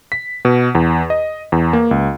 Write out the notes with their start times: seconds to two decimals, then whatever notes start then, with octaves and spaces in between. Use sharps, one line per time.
0.12 B6
0.45 B2
0.75 E2
1.10 D#5
1.52 E2
1.73 A#3
1.91 C#2